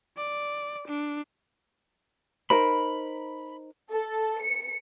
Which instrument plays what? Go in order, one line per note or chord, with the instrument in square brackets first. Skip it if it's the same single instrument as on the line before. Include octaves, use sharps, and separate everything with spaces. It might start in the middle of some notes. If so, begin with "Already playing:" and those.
[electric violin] D5
D4
[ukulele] D#4 A#4 C5 [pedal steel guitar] B5
[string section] A4
C#7